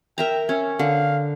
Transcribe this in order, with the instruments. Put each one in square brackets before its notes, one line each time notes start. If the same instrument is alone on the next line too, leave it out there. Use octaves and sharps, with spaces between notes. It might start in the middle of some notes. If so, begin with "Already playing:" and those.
[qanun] A#4 E5 A#5 [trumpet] G5
[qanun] C#4 [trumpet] E5
[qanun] D3 [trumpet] F5